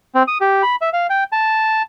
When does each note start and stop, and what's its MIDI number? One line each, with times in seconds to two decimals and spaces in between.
0.15 0.23 60
0.28 0.38 87
0.41 0.62 67
0.63 0.76 83
0.82 0.89 76
0.93 1.07 77
1.10 1.24 79
1.32 1.82 81